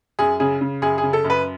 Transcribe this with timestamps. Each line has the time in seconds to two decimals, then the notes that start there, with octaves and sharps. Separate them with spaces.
0.19 F#2 G#4
0.40 C#3 G#4
0.61 C#3
0.82 F#2 G#4
0.98 G#4
1.03 C#3
1.13 A4
1.24 F#2
1.30 B4